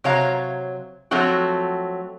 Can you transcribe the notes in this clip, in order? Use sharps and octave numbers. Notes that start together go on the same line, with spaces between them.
C3 F#3 C#5 F5 A#5
F3 F#3 A3 C4 F#4